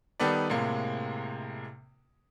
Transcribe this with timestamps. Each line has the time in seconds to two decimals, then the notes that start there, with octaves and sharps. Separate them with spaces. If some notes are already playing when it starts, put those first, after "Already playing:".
0.20 D#3 G3 B3 A4 B4 D5
0.49 A2 C3 G#3 A#3